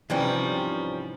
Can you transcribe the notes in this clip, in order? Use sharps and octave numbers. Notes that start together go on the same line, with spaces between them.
G#2 C3 E3 F3 G3 C#4